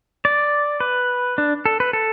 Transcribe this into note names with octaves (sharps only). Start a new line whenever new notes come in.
D5
B4
D4
A4
B4
A4